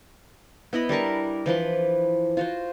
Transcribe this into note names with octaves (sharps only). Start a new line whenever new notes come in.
B3 E4 D#5 B5
G3 D4 A#4 C#6
E3 F3 B4 C6
F4 F#4 C5